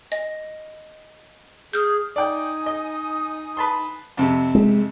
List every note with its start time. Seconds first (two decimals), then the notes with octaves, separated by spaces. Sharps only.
0.12 D#5
1.73 G#4 F6 G6
2.16 D#4 D5 G5 G#5 D#6
2.66 D#5
3.57 B4 A5 C6
4.17 F2 C3
4.55 G#3